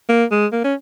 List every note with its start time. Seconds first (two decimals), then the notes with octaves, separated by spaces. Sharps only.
0.09 A#3
0.31 G#3
0.52 A#3
0.64 C#4